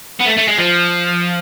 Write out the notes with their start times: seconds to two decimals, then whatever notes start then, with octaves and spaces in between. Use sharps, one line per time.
0.20 B3
0.25 A3
0.37 A3
0.48 G#3
0.58 F3